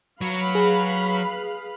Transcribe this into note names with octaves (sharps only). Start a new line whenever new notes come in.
F#3 B4 F5 B5
G#4